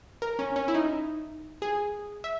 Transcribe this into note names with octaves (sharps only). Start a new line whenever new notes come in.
A#4
C#4
C#4
E4
D#4
G#4
E5